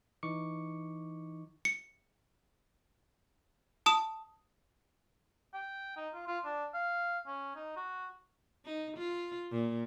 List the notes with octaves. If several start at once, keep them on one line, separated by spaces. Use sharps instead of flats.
E3 D#4 C#6 D6 C#7
C#7
A5 D#6 E7
G5
D#4
F4
F4
D4
F5
C#4
D#4
F#4
D#4
F4
A#2